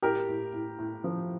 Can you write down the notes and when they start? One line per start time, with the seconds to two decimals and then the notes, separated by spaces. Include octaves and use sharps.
0.02 A2 G4 A#4
0.28 A2
0.53 A2
0.79 A2
1.04 F3